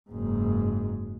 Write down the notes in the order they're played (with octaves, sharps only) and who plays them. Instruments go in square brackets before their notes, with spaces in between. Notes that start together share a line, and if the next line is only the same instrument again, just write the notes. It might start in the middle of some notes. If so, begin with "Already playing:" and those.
[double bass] F#1 G#2